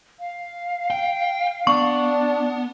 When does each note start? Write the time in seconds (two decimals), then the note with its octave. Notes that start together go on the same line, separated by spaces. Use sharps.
0.20 F5
0.90 G5
1.67 B3 D4 C#6